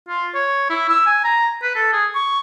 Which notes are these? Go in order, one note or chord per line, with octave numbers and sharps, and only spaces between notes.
F4
C#5
E4
E6
G#5
A#5
B4
A4
G#4
C#6